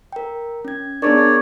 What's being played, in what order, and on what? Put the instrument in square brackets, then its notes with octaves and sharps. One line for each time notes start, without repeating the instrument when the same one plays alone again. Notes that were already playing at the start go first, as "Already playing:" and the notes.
[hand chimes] A#4 G5
C#4 G#6
[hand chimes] B3 G#4 A#4 [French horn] D4 [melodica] C#5 D5